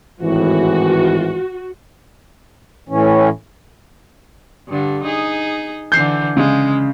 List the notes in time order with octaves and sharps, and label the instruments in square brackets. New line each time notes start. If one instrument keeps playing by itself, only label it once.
[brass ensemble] G#1 A2 E3 [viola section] F#4
[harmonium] A2 E3 C#4
[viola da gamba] G2 D3
D#4 G#4
[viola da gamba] D3 E3 [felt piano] G6 C7
[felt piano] C#3 [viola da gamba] G#3